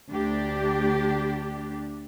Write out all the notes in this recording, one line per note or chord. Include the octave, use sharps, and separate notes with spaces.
D2 D4 G4